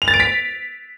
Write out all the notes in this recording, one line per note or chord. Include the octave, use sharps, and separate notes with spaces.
F7
A6
D7
B6